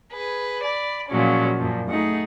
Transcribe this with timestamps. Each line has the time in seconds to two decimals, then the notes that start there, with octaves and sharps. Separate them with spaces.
0.11 G#4 B4
0.63 D5 B5
1.09 A#2 F3 F#3 G#3 C#4
1.59 F#2 A#2 F3
1.88 A3 D#4 G#4 F#5